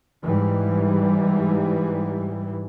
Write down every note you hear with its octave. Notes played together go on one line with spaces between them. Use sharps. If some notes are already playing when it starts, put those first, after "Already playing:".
G#2 E3 G3